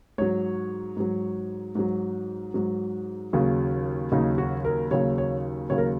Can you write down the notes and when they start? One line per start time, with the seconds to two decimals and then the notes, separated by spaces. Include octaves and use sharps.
0.18 G#2 F#3 C#5
0.97 G#2 F#3
1.75 G#2 F#3
2.54 G#2 F#3
3.33 D#2 C#3 F#3
4.12 D#2 C#3 F#3 D#4
4.38 F#4
4.65 A#4
4.91 D#2 C#3 F#3 C#5
5.18 C#5
5.70 D#2 C#3 F#3 C#5
5.78 A#4